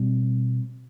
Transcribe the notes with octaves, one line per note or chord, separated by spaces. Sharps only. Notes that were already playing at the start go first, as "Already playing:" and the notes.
Already playing: B2 G3 C4